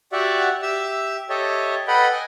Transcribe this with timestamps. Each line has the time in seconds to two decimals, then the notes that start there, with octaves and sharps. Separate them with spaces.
0.13 F#4 G4 D5 E5 F#5
0.62 G4 E5 E6
1.29 G4 A4 C#5 D#5 E5
1.88 A4 B4 D#5 F#5 G5 B5
2.12 D#5 G#5